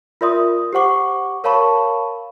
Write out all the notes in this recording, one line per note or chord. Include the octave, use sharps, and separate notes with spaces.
F4 A#4 D5 E5 C6 D#6
G4 C5 F#5 C#6 D6
A#4 C#5 F5 A5 B5 C#6